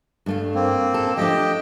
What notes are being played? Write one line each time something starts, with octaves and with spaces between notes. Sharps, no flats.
G2 A3 F5
A#3 C4
A4
F3 A3 D4 G4 D#5 G5